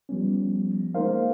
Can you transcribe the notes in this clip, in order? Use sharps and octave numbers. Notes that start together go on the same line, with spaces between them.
F3 G3 B3 C#4
G#3 A#3 D#4 A#4 C5 F5